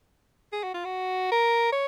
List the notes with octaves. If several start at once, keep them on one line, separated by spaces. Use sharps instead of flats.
G#4
F#4
F4
F#4
A#4
C#5